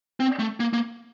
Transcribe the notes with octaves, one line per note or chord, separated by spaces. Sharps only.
C4
A3
A#3
A#3